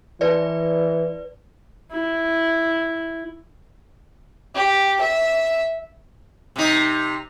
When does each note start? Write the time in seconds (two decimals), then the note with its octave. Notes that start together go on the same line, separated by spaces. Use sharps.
0.21 E3 B4 D5
1.91 E4
4.55 G4
5.01 E5
6.56 C3 D#4